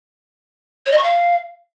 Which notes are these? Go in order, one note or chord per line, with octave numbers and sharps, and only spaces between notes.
C#5
D#5
C#6
F5